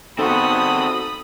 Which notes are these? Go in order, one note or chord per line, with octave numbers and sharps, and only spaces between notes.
B3 C4 D#4 F#4 A4 B5 C6 D#6